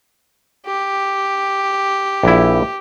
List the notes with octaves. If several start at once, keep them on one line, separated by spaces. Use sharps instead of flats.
G4
A#1 E4